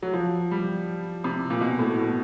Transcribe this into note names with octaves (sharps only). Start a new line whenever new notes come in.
F#3
F3
G3
C3
A#2
B2
A2
B2